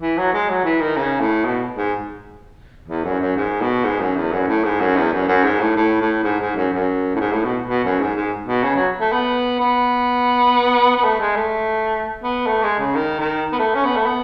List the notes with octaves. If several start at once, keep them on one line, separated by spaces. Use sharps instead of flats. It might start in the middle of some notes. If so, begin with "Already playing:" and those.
E3
F#3
G#3
F#3
E3
D#3
C#3
A2
B2
G#2
E2
F#2
F#2
G#2
B2
G#2
F#2
E2
F#2
A2
G#2
F#2
E2
F#2
F#2
G#2
A2
A2
A2
G#2
G#2
F#2
F#2
A2
G#2
A2
B2
B2
F#2
G#2
G#2
B2
C#3
F#3
A3
B3
B3
B3
A3
G#3
A3
B3
A3
G#3
C#3
D#3
D#3
B3
A3
C#4
B3
A3
B3